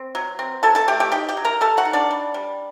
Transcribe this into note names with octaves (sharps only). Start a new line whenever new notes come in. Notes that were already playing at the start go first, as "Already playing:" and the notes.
Already playing: C4
F#3
C4
F#3 A4 A5
A4 A5
A3 G4 G5
G4 G5
D#4 G4 G5
G4 G5
F#3
A#4 A#5
G3 A4 A5
F#4 F#5
D#4
D4 D5
G3
G3